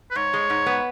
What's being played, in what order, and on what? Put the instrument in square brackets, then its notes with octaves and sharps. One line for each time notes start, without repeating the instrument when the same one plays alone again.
[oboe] B4
[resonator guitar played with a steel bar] G#2 [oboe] C#5
[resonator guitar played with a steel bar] G#3
G#2
B3